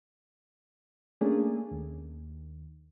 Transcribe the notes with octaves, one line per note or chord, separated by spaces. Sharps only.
A3 A#3 C#4 D4 G#4
D#2